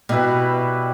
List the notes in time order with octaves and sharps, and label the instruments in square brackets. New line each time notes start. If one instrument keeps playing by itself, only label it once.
[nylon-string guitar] B2 [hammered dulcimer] G3 E4 B4